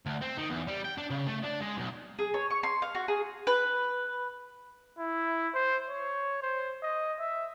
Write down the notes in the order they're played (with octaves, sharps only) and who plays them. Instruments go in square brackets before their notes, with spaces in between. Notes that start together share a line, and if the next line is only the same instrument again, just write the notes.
[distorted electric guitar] D2
C4
D#3
E2
G3
G5
D4
C#3
A3
D4
G#3
B1
[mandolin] G#4
C#5
C#6
C6
F5
F#4
G#4
B4
[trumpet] E4
C5
C#5
C5
D#5
E5